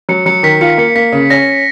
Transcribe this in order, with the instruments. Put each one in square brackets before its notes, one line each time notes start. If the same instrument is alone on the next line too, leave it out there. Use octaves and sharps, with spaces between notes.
[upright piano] F#3 [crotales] C#7
[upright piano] F#3 [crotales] C#7
[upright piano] D#3 [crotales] B6
[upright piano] F4 [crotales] C#7
[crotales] B6
[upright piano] A#3 [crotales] C#7
[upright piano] A#3 [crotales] B6
[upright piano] C#3
[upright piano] C#4 [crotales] A#6